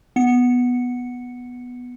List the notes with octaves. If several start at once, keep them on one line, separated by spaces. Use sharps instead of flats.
B3 C#7